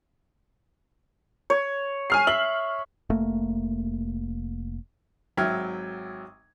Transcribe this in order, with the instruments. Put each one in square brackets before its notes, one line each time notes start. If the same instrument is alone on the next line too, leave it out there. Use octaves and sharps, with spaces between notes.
[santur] C#5
[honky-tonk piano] G#5 F6 C7
[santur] E5 [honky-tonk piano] F#7
[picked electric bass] F1 A3 A#3
[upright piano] G#1 F#3 E5 G5 F6 G#6